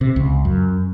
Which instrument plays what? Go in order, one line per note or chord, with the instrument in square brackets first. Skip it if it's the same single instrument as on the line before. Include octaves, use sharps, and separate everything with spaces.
[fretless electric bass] C3
C#2
F#2